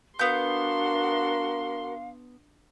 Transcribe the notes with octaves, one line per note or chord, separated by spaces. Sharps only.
B3 D4 F#4 A#4 F5 F#5 C6 G6